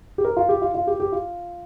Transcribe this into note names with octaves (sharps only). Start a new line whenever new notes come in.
G4
A#4
F4
G4
F4
F4
G4
G4
F4